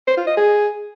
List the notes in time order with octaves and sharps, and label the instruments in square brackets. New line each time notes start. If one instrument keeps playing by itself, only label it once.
[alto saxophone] C5
F4
D#5
G#4